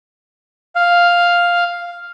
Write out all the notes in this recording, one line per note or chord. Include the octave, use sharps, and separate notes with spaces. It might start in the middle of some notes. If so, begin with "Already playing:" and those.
F5